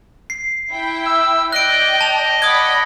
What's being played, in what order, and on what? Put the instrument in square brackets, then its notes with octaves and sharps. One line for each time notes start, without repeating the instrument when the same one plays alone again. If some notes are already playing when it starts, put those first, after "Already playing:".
[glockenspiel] C7
[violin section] E4 G5
[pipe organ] E6
[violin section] D5 G5 [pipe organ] D#5 [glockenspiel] F#6 D7
[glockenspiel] A5 F7
[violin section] D5 F#5 B5 [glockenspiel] D#6 F#6 G#6